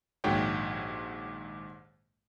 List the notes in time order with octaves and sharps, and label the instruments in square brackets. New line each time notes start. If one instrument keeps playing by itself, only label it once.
[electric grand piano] A#1 D#2 G#2 F#4 C#5 G5